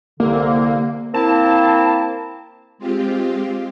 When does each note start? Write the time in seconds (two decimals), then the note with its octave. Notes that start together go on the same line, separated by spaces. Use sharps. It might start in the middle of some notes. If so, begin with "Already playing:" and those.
0.20 C2 D3 A#3
1.14 A#3 C4 E4 A5
2.78 G#3 C4 F4 G4